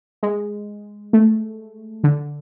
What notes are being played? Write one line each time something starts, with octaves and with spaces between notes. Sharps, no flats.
G#3
A3
D3